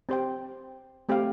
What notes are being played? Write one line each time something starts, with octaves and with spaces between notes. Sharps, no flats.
C4 G4 C5 G5
A3 C4 G4 F5